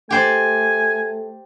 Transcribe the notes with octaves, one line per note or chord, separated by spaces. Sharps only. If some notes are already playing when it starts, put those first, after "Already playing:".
A3 G4 C5 D5 G#5